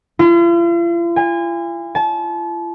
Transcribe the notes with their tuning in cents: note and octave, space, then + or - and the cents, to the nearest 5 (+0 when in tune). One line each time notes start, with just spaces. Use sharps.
F4 -45
G#5 -30
A5 -35